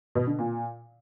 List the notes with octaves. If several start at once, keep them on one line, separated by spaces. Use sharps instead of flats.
B2
D3
A#2